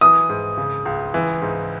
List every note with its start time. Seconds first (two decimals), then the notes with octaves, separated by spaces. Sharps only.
0.01 E3 D#6
0.29 G#2
0.57 C#3
0.85 C#2
1.14 E3
1.42 G#2